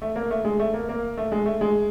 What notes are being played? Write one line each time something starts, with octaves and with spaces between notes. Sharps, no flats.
A3
A#3
A3
G#3
A3
A#3
A#3
A3
G#3
A3
G#3